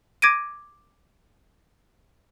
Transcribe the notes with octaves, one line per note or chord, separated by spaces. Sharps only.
D6 G#6 A#6 D7 D#7